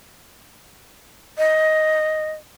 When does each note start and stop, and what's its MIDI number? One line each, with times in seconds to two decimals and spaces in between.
1.38 2.33 75